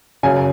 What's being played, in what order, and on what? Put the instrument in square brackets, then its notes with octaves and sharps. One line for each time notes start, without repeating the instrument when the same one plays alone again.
[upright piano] F#2 C#3 G#5